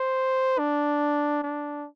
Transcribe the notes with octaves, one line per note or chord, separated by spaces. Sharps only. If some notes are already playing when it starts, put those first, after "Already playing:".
Already playing: C5
D4
D4